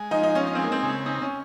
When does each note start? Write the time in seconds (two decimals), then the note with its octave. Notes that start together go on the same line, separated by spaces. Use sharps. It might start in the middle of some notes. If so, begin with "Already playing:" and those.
Already playing: G#3
0.11 F3 D#4
0.23 D#4
0.35 C#4 D#4
0.47 C#4
0.55 C4
0.59 G#3 A#3
0.72 C4
0.83 C#3
1.06 C4 D#4
1.22 C#4